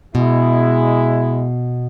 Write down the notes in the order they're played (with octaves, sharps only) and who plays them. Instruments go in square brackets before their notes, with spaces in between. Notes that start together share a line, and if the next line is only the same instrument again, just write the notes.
[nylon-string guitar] B2 [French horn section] G#3 E4